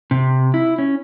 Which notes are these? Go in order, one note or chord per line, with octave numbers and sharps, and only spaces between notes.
C3
E4
C#4